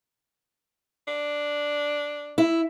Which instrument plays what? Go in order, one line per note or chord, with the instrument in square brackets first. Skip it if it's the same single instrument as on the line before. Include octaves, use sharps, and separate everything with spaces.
[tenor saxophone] D4
[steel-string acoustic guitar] E4